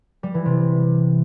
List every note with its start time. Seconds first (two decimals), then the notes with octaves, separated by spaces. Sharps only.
0.23 G3
0.34 E3
0.45 C3